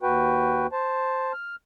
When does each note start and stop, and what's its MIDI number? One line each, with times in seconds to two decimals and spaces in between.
0.02 0.67 39
0.02 0.67 66
0.02 0.67 71
0.02 0.67 79
0.72 1.33 72
0.72 1.33 81
1.33 1.56 89